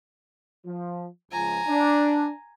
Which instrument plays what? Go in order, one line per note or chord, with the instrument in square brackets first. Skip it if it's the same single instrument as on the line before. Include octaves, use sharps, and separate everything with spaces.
[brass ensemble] F3
[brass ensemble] C#2 F3 [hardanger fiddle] G#5 A#5
[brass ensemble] D4